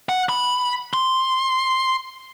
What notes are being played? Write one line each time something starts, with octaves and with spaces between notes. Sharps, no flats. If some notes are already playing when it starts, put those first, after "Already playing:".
F#5
B5
C6